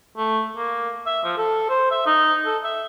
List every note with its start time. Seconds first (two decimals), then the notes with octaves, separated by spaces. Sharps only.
0.17 A3
0.57 A#3
1.06 E5
1.24 F3
1.37 A4
1.69 C5
1.92 E5
2.06 D#4
2.46 A4
2.64 E5